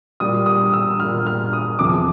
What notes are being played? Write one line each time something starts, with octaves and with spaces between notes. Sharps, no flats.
A#2 G3 D#6
D#6
E6
A#2 G3 F6
F6
D#6
E2 C3 F3 D6